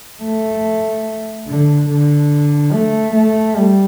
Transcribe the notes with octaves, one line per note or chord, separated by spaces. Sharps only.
A3
D3
D3
A3
A3
G3